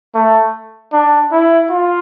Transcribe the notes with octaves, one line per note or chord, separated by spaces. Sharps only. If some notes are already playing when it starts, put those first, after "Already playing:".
A3
D4
E4
F4